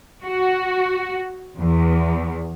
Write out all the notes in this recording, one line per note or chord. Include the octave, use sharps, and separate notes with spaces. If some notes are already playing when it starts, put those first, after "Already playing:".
F#4
E2